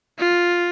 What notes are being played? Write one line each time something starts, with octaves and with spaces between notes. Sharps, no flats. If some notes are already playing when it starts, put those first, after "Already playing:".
F4